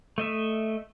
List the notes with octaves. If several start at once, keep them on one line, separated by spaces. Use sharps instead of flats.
A3 D#5 E5